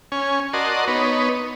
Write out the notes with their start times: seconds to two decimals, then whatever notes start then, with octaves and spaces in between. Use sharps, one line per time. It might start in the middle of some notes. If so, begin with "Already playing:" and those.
0.12 C#4 G#5
0.53 F#4 A#4 D5 D#5 A5 C6
0.88 B3 D#4 B4 C#5